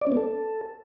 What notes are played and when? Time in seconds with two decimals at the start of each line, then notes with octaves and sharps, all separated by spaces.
0.01 D5
0.07 C#4
0.12 B3
0.17 A4